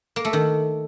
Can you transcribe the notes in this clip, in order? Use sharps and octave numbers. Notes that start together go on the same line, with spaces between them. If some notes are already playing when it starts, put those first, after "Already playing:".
A#3
A3
D#3